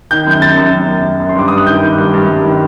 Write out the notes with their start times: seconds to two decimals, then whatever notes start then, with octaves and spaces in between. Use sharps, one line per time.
0.11 D#3 G6
0.27 F#2 G6
0.42 F#2 A6
0.57 F#2
0.74 F#2
0.88 F#2
1.05 F#2
1.20 F#2
1.29 C6
1.35 G2 D6
1.48 G2 D#6
1.58 F#6
1.67 D#3 G6
1.83 D#3
1.98 G2
2.13 G2
2.29 G2
2.44 D#3